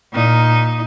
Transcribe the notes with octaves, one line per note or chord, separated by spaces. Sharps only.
A#2 D#4